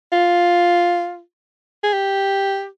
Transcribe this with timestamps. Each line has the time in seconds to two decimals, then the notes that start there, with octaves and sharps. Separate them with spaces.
0.12 F4
1.84 G#4
1.93 G4